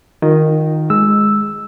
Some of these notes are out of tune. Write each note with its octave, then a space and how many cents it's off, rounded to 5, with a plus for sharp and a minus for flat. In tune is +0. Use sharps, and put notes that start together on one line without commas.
D#3 +0 F4 +30 D#5 -5
G#3 +0 E6 +0